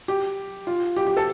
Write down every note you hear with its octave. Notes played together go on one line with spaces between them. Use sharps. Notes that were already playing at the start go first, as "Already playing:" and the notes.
G4
F4
G4
G4
A4